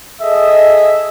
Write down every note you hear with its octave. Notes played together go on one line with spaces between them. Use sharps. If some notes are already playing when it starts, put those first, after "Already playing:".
G#4 A4 D#5 E5